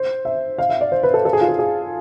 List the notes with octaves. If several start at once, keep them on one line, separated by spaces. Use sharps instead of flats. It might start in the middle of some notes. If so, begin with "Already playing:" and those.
Already playing: C5
E5
F5
E5
D5
C5
B4
A4
A4
G#4
F4
G#4
G#4